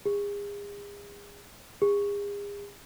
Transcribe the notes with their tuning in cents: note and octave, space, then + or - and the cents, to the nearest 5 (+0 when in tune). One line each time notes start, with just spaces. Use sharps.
G#4 -35
G#4 -40